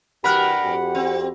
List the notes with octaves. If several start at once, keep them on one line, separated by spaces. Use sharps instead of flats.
G2 E3 F#4 G4 A#4 F#5 B5 F#6
F2 F#4 G4
C4